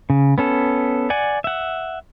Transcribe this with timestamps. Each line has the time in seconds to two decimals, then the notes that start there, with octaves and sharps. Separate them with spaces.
0.10 C#3
0.38 B3 C#4 A4
1.10 D5 F#5 G#5
1.44 E5 F#5